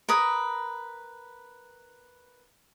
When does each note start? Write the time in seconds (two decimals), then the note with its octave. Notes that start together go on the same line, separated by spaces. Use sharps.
0.09 A#4 B4 D#6